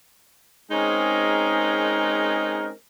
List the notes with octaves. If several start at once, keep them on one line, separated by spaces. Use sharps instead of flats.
G#3 C4 C#4 D#4 G#4 A#4